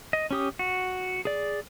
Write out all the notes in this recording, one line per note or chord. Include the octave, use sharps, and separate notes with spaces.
D#5
C#4 G4 D#6
F#4
G#4 D5